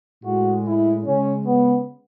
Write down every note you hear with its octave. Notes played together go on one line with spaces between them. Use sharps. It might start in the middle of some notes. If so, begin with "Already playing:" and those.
A2 G#3 F#4
E4
C#3 G#3 C#4
B3